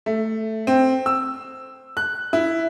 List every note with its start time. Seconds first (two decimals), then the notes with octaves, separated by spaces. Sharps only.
0.06 A3
0.67 C4
1.06 E6
1.97 F#6
2.33 E4